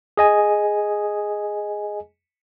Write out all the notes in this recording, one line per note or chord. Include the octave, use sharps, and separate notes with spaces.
G#4 D#5 G#5